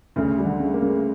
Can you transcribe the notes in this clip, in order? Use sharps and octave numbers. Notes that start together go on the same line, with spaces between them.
D2 C#3
G3
D3
C#3
A#3
C#3